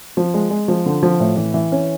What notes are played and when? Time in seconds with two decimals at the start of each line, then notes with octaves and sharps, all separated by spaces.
0.17 F3
0.34 G#3
0.50 G#3
0.68 F3
0.86 D3
1.03 F3
1.20 A2
1.37 E3
1.54 E3
1.72 C#4